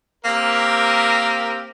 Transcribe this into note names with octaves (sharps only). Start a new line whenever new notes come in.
A#3 C4 G4 A#4